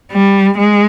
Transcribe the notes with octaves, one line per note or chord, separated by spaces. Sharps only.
G3
G#3